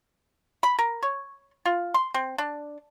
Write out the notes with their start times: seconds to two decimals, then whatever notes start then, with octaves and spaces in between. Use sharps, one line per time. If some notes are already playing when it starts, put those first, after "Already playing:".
0.63 B5
0.79 A#4
1.03 C#5
1.66 F4
1.94 C6
2.14 C4
2.38 D4